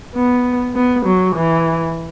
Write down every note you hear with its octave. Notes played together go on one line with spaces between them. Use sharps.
B3
B3
F#3
E3